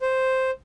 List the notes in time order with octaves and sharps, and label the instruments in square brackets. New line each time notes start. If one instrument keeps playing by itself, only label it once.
[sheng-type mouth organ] C5